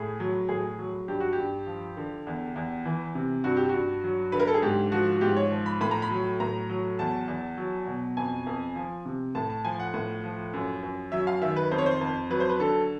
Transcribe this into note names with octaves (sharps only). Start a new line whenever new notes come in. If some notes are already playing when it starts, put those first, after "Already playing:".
Already playing: A2 G#4
F#3
A2 G#4
F#3
G2 G4
F#4
G4
G2
F3
D3
E2
E2
E3
C3
G2 F#4
G4
G2 F#4
F#3
D3 B4
A#4
A4
G#4
G#2 G4
F3 F#4
F#4
G#2 G4
C#5
F3
B5
A2 B5
A#5
B5
F#3
A2 A#5
F#3
E2 A5
E2
F#3
B2
F2 G#5
F2
F3
C3
A2 A5
A5
F3 G#5
F#5
A2
F3
F#2
F#2
F#3 E5
F5
D#3 E5
B4
F2 C5
C#5
C5
F2
F#3 B4
C5
B4
D3 A4